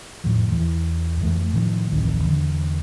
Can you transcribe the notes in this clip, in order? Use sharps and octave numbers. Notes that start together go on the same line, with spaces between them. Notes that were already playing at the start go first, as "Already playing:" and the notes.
F2 A2 D#3 F3
E2 E3
F2 E3 G#3 A3
A2 D#3 F3
D1 A1 F2 D#3
E2 D3